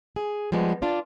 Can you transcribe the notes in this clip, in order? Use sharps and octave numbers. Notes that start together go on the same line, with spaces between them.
G#4
F3 G3 G#3 B3
D4 F4 D5